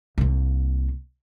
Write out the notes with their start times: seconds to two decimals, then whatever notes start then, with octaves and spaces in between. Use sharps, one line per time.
0.18 C2 A#3